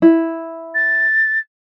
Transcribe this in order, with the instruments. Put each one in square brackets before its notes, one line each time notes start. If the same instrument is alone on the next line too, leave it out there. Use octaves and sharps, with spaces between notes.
[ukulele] E4
[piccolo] A6